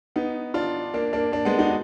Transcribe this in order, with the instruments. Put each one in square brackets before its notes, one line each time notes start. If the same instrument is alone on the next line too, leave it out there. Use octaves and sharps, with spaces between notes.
[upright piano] B3 D#4
D4 F4
A#3 D4
A#3 D4
A#3 D4
G#3 B3
D#4 F#4